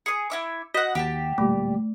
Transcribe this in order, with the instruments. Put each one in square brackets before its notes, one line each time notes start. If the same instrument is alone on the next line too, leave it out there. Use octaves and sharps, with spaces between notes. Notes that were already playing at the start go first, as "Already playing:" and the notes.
[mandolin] G#4 D#6 [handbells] C#7
[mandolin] E4 E5 D6
[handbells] F#4 [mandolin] D#5 F#5
[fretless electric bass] D#2 [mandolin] G4 G5 A5 [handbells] F#5
[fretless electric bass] D1 A#2 G3 [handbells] A3